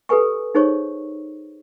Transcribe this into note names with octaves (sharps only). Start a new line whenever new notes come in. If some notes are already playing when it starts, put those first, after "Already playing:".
G4 A4 B4 G#5 C#6
D#4 G#4 C5 C#5 C#6